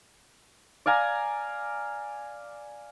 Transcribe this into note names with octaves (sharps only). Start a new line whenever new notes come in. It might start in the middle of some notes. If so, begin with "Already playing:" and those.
D5 F5 G#5 A#5